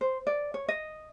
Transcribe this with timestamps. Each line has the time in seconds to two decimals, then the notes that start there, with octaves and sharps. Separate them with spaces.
0.01 C5
0.27 D5
0.54 C#5
0.68 D#5